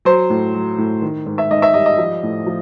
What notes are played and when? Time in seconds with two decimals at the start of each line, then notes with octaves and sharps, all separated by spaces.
0.05 F#3 C5
0.30 A2
0.54 F#3
0.78 A2
1.02 D#3
1.26 G#2
1.38 E5
1.51 G#2 D#5
1.62 E5
1.74 G3 D#5
1.86 D#5
1.98 F3
2.23 A2
2.46 F3